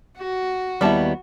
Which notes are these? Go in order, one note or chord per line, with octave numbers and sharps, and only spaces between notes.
F#4
D#2 G3 B3 E4 A5